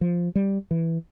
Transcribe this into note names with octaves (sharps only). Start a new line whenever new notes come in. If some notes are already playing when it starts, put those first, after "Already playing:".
F3
G3
E3